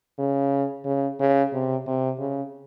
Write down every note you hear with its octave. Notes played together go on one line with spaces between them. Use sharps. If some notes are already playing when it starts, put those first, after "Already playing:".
C#3
C#3
C#3
C3
C3
C#3